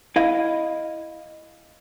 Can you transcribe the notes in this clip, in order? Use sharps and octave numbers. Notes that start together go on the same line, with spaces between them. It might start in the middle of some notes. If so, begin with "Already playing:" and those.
E4 D#5 F5